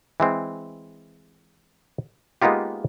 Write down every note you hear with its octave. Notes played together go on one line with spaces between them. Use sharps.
E3 G#3 C4
G#3 A#3 B3 D#4 F4 G4